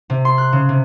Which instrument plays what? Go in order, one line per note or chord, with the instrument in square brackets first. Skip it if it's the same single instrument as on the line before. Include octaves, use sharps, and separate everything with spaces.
[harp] C3
C6
F#6
C#3
C3